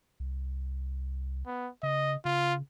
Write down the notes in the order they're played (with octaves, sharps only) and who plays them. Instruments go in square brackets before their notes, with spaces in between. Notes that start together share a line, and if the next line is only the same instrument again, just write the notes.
[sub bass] C2
[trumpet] B3
[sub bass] C#3 [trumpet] D#5
[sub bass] C#3 [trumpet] F4